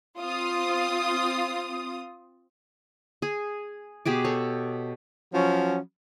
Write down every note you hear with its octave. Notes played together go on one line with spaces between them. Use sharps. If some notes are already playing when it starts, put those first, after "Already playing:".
C4 F4 D#6
G#4
B2 G4 G#4 D6
A4 C#5
F3 F#3 C#4